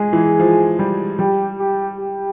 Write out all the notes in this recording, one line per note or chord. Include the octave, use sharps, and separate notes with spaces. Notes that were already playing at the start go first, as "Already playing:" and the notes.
Already playing: G#3 G#4
E3
F3
G3
G3 G4
G4
G4